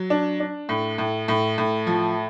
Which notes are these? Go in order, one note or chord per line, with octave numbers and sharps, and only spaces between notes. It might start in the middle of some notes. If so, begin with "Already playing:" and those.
Already playing: F#3
D4
D4
A2
A2
A2
A2
F3